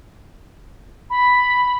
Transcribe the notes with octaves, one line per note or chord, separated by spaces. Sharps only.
B5